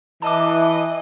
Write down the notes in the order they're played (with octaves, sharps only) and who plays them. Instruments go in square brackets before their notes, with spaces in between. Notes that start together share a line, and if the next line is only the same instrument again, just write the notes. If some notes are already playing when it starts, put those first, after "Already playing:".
[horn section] E3 [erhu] D#5 [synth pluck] A5 D6